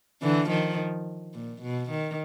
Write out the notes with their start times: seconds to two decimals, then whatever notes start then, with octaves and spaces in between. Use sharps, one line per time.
0.22 D3 E3
0.49 D#3 F3
1.34 A#2
1.62 B2
1.90 D#3